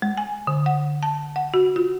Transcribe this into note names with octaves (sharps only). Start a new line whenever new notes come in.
G#3
G#5
D3
F#5
A5
F#5
F#4
F4